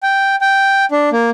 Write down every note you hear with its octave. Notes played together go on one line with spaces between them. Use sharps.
G5
G5
D4
A#3